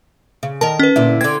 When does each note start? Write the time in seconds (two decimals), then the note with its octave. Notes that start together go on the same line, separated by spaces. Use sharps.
0.43 C#3
0.61 D#3 A#4 A5
0.79 C#4 B4
0.96 A#2 D3 E4
1.21 D3 C4 G#6